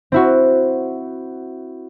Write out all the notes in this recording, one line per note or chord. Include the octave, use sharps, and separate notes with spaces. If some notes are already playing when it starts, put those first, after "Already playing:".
C4 E4 F#4